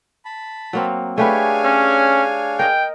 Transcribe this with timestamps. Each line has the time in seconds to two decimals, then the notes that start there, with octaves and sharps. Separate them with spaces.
0.25 A5 B5
0.73 F#3 A#3 C4
1.18 A3 D4 G4 G#4 B4 C#5 F5 G#5
1.64 C#4
2.59 A#4 D#5 G5